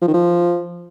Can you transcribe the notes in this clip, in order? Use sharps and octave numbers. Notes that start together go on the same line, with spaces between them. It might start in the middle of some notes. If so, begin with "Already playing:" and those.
F3
D#3
F3